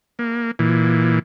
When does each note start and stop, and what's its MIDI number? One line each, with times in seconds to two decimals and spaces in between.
0.19 0.51 58
0.59 1.19 46
0.59 1.19 52